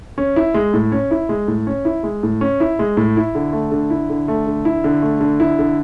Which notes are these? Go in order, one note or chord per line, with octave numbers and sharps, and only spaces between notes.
C#4
E4
G#3
A2
C#4
E4
G#3
A2
C#4
E4
G#3
A2
C#4
E4
G#3
A2
E4
D3
A3
D3
E4
D3
A3
D3
E4
D3
A3
D3
E4
D3